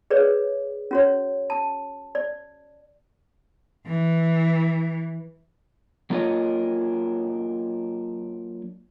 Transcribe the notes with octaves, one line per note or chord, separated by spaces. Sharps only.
G#4 B4 C#5 D5
C#4 F#4 C#5
A5
D5
E3
F#3 A#3 D4 F4 C#5 D#5